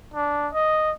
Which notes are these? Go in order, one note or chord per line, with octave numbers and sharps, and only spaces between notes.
D4
D#5